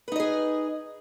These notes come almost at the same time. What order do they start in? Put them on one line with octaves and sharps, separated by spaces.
B4 D#4 D#5 G#4